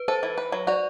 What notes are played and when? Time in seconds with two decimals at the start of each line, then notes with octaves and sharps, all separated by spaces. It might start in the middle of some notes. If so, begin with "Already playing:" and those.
Already playing: B4
0.08 A4 C5
0.23 E3
0.38 B4
0.52 F#3
0.67 F#4 D5